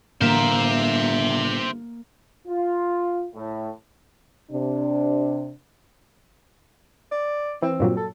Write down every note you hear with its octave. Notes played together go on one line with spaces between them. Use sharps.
G1 A2 D3 E3 A#3 C5 E5
F4
A2
C3 D4
D5
E3 C4
G2 A#2 F#3
A4